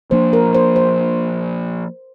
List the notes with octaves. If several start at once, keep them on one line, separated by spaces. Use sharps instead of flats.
F3 A#3 D4 C5
A#4
C5
C5